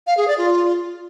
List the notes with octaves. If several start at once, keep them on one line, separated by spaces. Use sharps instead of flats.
F5
G#4
D5
F4